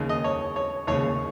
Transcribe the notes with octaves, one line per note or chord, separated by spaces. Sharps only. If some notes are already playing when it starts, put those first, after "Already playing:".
Already playing: D#2 C#3
D#5
C#5
C#5
D#2 C#3 C#5